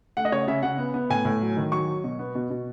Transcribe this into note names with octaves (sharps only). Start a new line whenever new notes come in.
A3 F#5
D#5
C#3 C#5
C#3 E5
C#3 F#5
B3
B3
A2 G#5
A2
F#3
D#3
F#3 C#6
F#3
B2
B3
B2
B2